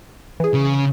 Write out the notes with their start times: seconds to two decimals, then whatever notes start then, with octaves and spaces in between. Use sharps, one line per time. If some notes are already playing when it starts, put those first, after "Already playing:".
0.40 E3 G#4
0.54 C#3